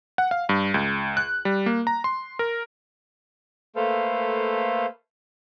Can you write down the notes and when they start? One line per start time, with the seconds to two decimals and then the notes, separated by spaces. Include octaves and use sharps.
0.18 F#5
0.31 F5
0.49 G2
0.74 C#2
1.17 F#6
1.45 G3
1.66 A#3
1.87 A#5
2.04 C6
2.39 A#4
3.76 A3 A#3 A4 B4 C5 F5